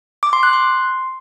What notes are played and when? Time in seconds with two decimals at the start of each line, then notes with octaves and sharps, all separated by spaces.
0.23 D6
0.33 C6
0.43 F#6
0.53 C6